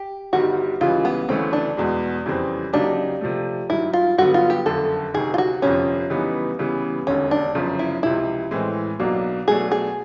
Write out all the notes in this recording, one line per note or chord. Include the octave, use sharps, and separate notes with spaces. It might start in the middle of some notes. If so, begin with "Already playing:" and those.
Already playing: G4
G1 G2 D#3 G3 F#4
C#2 C#3 E3 G3 F4
B3
D2 C#3 E3 A3 C4 C#4
D4
E2 B2 G#3
F2 C#3 E3 G3 C4
C#3 F#3 A#3 D4 D#4 G4
C3 F3 A3
G2 D#3 F#3 E4
F4
G2 D3 F#3 B3 F#4
F4
G4
F#1 F2 D3 A4
D2 C3 D#3 G#4
F4
F#4
G1 F2 C3 F3 C#4
C#3 E3 G3 B3 D#4
C#3 E3 G3 B3
E1 D#2 D3 C#4
D4
G1 F#2 C#3 F3
E4
C#2 C3 F3 E4
A2 E3 G#3 C4
B1 B2 F#3 A#3 D4
B2 F#3 A3 D4 G#4
G#4